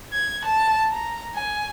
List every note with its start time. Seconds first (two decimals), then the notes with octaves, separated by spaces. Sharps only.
0.13 G#6
0.45 A5
0.91 A#5
1.35 G#5